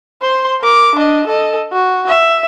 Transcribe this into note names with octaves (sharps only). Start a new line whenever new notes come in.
C5 C6
A#4 D6
D4 D#5
A4 D#5
F#4
E5